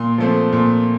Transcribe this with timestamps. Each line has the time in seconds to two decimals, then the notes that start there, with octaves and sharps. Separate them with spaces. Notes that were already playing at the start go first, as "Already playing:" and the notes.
Already playing: A#2 C6
0.18 F3 A3 C4
0.52 A#2